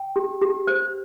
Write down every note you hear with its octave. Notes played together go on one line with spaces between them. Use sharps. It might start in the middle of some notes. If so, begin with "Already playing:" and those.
Already playing: G5
G4
G4
C5